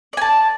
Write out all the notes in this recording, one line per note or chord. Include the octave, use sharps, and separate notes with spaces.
D5 G#5 A5